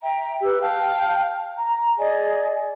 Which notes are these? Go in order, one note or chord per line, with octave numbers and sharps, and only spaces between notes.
E5 G5 A#5
G4 B4 E6
F5 G5 A5 F6
A#5
G#4 D5 D#5 G#5